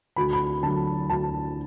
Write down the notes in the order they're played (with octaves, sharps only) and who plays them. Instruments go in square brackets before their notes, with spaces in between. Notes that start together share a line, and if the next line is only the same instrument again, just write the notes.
[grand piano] D2 B5
B5
D3 F#3 A5
D2 A5